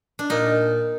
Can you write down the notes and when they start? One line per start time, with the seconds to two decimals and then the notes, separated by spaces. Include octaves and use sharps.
0.19 D4
0.30 A#2 D#4